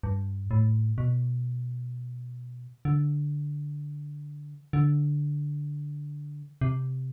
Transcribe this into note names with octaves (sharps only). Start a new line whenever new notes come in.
G2
A2
B2
D3
D3
C3